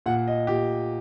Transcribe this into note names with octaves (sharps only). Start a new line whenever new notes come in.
A#2 F#5
D#5
A#2 G4